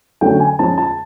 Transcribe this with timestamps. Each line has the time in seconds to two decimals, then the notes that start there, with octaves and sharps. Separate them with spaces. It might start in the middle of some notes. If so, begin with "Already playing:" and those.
0.21 D3 F#3 A3 C#4 G5
0.40 G#5
0.59 F3 G#3 C#4 A5
0.78 A5